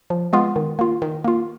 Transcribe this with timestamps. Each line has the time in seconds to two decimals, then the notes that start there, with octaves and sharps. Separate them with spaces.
0.10 F3
0.33 G#3 B3 F4
0.56 D#3
0.79 A#3 F4
1.02 D#3
1.24 A#3 F4